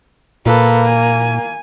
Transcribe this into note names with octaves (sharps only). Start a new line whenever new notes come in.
A#2 A#3 A4 B4
G#5